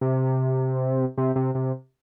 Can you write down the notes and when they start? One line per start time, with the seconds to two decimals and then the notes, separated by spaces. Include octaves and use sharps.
0.01 C3
1.18 C3
1.36 C3
1.55 C3